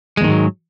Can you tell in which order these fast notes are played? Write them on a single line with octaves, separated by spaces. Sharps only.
G#3 E2 D#3 G#2 F#3